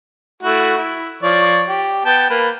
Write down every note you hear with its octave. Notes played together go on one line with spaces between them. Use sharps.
A3 E4 F#4
E4
F3 C#5 D5
G4
B3 G5 A5
A#3 B4